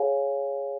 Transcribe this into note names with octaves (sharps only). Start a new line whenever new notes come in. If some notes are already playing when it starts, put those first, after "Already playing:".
Already playing: G#4 C#5 F5 G#5